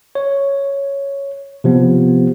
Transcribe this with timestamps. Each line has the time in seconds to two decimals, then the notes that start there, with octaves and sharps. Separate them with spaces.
0.15 C#5
1.64 C3 F3 B3